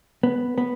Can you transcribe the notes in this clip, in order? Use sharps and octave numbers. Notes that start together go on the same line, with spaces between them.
B3
B3